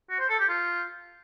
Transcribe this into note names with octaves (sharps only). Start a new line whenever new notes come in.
F#4
C5
A4
G4
F4